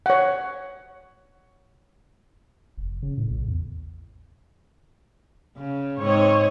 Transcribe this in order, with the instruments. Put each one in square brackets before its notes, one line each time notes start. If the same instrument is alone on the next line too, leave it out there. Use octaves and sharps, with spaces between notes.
[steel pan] C#5 F#5
[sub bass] F1
C#3
A2
A#1
E2
[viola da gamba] C#3
[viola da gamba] G#2 C4 D#5 [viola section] C#5